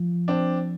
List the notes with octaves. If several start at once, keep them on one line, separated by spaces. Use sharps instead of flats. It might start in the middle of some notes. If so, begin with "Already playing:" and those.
Already playing: F3
C4 D4